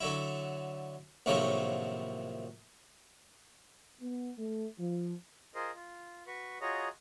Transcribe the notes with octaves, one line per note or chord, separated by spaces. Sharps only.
D3 F#3 E4
A#1 A2 C3 D#3 F3 F#3
B3
A3
F3
F4 G#4 A#4 C5 D#5
F4
F#4 B4 C#6
F4 F#4 G#4 C#5 D#5 A#5